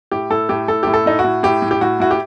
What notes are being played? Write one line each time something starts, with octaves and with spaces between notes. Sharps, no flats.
A2 G4
A2 A4
A2 G4
A2 A4
A2 G4
A4
A2 D#4
F#4
A2
A2 G4
A2
G4
A2 F#4
A2 F#4
G4